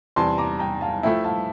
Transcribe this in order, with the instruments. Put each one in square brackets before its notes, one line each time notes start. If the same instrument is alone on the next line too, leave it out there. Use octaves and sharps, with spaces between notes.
[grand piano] E2 C3 G3 [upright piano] A5 C6
[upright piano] A#5 D6
G5 A#5
F5 A5
[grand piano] F3 A3 E4 [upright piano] E5 G5
[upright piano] F5 A5